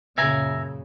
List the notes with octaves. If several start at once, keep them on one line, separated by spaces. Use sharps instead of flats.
F#2 A#2 C#3 E5 G#5 A#5